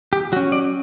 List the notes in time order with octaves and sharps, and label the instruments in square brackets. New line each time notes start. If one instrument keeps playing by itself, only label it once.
[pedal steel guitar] G4
F#3 F#4
C#4
D5